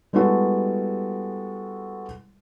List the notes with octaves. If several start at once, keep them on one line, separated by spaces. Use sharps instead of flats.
G3 G#3 B3 E4 F#4 A4